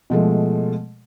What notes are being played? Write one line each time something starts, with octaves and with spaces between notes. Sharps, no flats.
B2 F3 G#3 A3